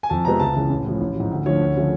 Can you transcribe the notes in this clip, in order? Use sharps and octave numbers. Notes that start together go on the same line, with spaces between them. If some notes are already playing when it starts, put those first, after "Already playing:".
G#5
F2 A5
C3 F3 G#3 B3 A#5
C#2 A5
C#3 E3
A1
A2 F3
A1
G#2 F3
D2
D3 F3 A3 C#5
D2
C#3 F3 A3